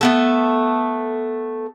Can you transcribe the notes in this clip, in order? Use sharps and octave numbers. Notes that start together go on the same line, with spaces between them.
A3 B3 A4